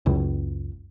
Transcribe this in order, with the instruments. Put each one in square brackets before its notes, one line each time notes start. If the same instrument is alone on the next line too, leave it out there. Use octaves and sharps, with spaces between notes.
[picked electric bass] F#1 C#2